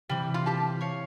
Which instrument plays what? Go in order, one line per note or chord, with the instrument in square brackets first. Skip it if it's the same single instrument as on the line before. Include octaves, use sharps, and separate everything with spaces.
[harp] C3 E3 [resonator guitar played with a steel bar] G3
[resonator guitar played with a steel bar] F4
G4 A5
[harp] C#5 F5